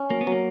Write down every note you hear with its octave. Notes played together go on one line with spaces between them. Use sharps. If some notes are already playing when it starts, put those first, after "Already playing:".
Already playing: C#4
F#3 A#3
B3
F#3 A#3